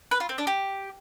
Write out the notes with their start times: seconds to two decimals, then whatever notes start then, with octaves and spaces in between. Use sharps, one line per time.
0.11 B4
0.20 F4
0.29 C4
0.38 D4
0.47 G4